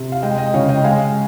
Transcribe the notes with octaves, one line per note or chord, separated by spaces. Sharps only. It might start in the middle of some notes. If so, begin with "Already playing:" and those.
Already playing: C3
F5
G#3 D#5 G5
D#5 G5
C#3 C#5 F5
D#5 G5
G#3 F5 G#5